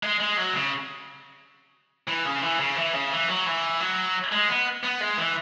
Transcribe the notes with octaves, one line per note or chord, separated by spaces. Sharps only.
G#3
G#3
F#3
C#3
E3
C#3
E3
C#3
E3
C#3
E3
F#3
E3
F#3
G#3
B3
B3
G#3
E3